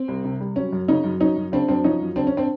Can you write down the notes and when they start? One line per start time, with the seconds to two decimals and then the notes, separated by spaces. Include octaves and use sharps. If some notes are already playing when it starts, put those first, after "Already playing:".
Already playing: C4
0.08 C2
0.25 C3
0.40 G3
0.56 F#3 C#4
0.72 F#2
0.88 C#3 C#4 D#4
1.04 F#2
1.20 F#3 C#4 D#4
1.36 F#2
1.52 C#3 C4 D4
1.68 F#2 C4 D4
1.84 F3 C#4 D#4
2.00 F#2
2.16 C#3 C4 D4
2.27 C#4
2.37 C4 D4